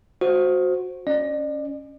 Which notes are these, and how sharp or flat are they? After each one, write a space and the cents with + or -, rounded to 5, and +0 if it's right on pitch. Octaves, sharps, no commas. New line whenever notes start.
F#4 -10 C5 +0
C#4 +0 D5 +40